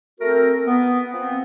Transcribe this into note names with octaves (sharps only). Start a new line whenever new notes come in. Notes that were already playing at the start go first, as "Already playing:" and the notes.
A3 C4 F#4 A#4
B3
F3 B3 C4